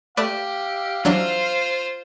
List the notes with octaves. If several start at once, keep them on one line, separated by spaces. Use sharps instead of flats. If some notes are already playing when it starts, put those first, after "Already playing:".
A3 G4 B4 D5 F5
E3 F#3 D4 F4 C5